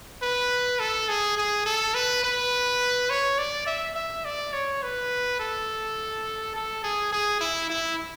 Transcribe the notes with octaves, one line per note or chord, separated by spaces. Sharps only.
B4
A4
G#4
G#4
A4
B4
B4
C#5
D5
E5
E5
D5
C#5
B4
A4
A4
G#4
G#4
E4
E4